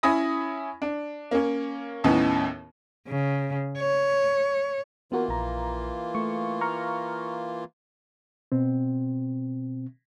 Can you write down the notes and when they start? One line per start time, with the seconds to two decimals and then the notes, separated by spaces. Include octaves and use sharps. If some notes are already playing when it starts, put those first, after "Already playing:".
0.03 C#4 E4 G#5 B5 D#6 A#6
0.82 D4
1.31 A#3 C#4
2.04 D#2 A2 B3 C#4 D#4
3.08 C#3
3.79 C#5
5.12 E3 A#3 B3 F4 F#4 A#4
5.29 A#1 A#5
6.15 A3 C#6
6.61 A#5 C#6 F6
8.52 B2 C4